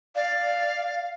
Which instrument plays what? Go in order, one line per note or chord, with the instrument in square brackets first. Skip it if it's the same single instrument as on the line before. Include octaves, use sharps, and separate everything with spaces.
[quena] D5 [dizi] F5